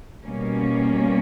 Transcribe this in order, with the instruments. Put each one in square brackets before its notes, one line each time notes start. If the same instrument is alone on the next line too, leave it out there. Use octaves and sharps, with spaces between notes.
[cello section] B2 G3 A#3 C#4